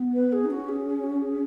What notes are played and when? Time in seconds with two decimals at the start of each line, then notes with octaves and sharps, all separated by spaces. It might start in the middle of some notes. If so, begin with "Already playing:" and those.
Already playing: B3
0.14 B4
0.33 G#4
0.45 D#4
0.50 C#4 F#4
0.69 G#4
0.86 G#4
1.04 F#4
1.22 G#4